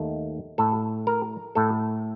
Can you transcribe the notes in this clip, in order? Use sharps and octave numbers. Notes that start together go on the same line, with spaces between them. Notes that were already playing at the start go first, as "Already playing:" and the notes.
Already playing: D#2 D#3 A3
A2 A3 A4
A#4
A2 A3 A4